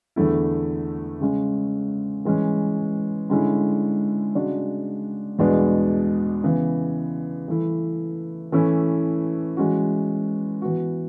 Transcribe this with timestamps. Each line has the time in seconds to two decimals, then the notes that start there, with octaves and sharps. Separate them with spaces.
0.16 E2 D3 A3 E4
1.20 C#3 G#3 C#4
2.25 E3 G#3 C#4
3.30 D3 G#3 C#4 E4
4.35 C#3 G#3 D4 F#4
5.39 E2 B2 G#3 B3 D4
6.44 C#3 E3 B3
7.48 E3 A3 E4
8.52 E3 A3 C#4 E4
9.57 E3 G#3 C#4 F#4
10.62 E3 B3 F#4